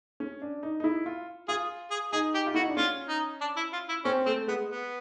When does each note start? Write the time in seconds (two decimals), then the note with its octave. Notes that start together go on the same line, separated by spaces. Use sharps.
0.20 C#4
0.42 D4
0.63 D#4
0.80 D#4
0.84 E4
1.06 F4
1.48 F4 G#4
1.91 G#4
2.12 D#4 G#4
2.34 G4
2.46 F4
2.54 E4 F#4
2.62 D#4
2.69 D4
2.77 C#4 F4
3.08 D#4
3.41 D4
3.57 E4
3.73 F4
3.89 E4
4.05 C4 C#4
4.26 A3 C4
4.47 G#3 B3
4.69 B3